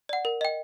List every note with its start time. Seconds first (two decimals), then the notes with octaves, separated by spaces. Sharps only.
0.09 D5 F#5
0.25 A#4
0.41 D#5 G5